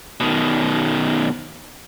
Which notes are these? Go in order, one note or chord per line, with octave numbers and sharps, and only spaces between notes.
B2 D#3